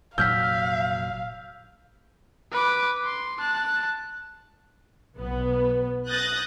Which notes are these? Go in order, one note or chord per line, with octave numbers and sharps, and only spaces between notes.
F1 A#2 F#3 F5 E6 F6 G6 B6
B4 D6
C6
A5 F#6
B1 B3
D#6 F#6 G6 A6 A#6